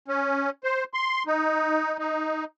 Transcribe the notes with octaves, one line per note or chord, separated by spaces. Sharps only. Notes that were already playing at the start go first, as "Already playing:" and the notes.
C#4
C5
C6
D#4
D#4